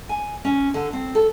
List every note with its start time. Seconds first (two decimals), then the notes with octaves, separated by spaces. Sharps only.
0.09 G#5
0.45 C#4
0.74 D3
0.93 C4
1.15 A4